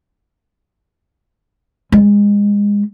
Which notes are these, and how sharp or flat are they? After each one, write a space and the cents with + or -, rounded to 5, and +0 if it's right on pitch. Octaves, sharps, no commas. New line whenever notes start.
G#3 -25